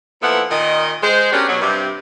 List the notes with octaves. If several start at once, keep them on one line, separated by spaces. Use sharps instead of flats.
A#2 F3 B3 E4 A4 F#5
A#2 D#3 D#5
G#3 C5
B3 C#4 D4 F#4 G4 A#4
B2 F#3
G2 C3